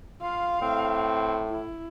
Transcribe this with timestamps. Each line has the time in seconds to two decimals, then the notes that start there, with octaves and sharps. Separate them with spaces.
0.22 F4 F5
0.62 A2 C4
1.49 E4